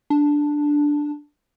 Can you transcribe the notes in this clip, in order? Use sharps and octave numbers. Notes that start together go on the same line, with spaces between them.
D4